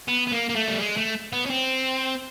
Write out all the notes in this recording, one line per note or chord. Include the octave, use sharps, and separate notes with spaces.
B3
B3
A#3
A#3
A3
G3
G#3
A3
B3
C#4
C4